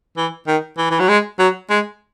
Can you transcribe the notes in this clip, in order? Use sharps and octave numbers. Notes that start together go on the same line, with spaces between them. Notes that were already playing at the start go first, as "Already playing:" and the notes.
E3
D#3
E3
E3
F#3
G#3
F#3
G#3